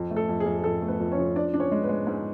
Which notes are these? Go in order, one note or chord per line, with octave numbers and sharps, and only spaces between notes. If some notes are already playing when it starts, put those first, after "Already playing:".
Already playing: F2
A3
A4
F2
G#4
F2
G#4
F2 A4
A3
B3 B4
F2
C#4 C#5
F3
D4 D5
D4
C#4 C#5
G#3
B3 B4
G#3
G#2